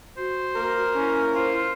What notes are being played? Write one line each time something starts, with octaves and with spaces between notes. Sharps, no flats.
F#4 C5
A#3 A#4
C#4 E4
F4 C5